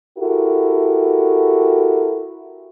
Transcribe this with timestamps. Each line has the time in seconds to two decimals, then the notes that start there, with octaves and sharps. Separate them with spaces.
0.19 E4 F#4 G4 A4 A#4